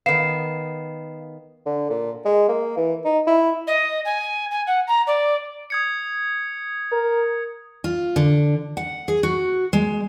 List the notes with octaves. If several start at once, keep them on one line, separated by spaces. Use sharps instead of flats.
D#3 B3 F5 C7 E7
D3
A#2
G#3
A#3
E3
D#4
E4
D#5
G#5
G#5
F#5
A#5
D5
D#6 G#6 C#7
A#4
F4
D3
F#5
G#4
F#4
G#3